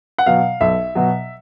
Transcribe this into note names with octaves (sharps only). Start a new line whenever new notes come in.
F#5
B2 F#3 F5
B1 E5
B2 F#3